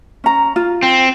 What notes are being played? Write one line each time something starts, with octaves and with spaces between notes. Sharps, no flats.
C#4 A#5
F4
C4